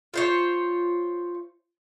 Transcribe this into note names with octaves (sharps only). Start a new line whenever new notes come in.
F4 C5 C#5